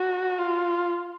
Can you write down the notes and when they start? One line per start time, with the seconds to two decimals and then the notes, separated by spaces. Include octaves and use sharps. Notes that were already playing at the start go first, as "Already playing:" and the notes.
Already playing: F#4
0.39 F4